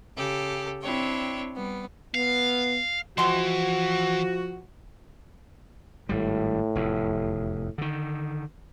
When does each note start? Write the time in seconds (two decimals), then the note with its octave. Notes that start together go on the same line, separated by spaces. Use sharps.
0.17 C#3 G4 A4
0.82 C4 D4 E4 C#5 G5
1.56 G3 B3
2.15 B3 F5
3.18 C3 E3 F3 G#3 F#4 C6
6.09 G#1 A2 G3
6.75 F1 E2
7.78 D3 D#3